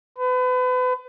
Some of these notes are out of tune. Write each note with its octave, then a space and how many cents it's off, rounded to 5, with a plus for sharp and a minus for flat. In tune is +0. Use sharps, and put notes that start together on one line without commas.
B4 +35